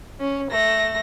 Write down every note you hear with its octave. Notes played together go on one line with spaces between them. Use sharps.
C#4
A3 A#6